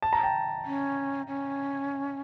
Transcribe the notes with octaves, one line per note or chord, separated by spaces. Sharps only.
A5
A#5
G5 A5
C#4
C#4